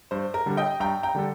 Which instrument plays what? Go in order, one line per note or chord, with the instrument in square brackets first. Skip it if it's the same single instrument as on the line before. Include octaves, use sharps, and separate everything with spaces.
[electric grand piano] G2 [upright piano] C5
[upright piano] A#4
[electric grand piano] D3 G3 D4 A4
[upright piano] D#5 G5
[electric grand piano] G2 [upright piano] G5 A#5
[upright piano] G5 A#5
[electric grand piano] D3 G3 D4 A4